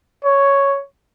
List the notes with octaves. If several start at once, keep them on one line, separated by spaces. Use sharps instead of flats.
C#5